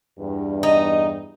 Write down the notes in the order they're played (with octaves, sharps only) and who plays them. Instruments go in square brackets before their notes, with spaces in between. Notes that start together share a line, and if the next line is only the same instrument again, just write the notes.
[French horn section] E2 G2
[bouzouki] D#4